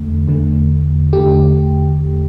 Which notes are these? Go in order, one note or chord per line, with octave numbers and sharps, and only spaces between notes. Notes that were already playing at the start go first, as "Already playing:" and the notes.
Already playing: E2 D3 A3
E2 D3 A3
E2 D3 A3 G4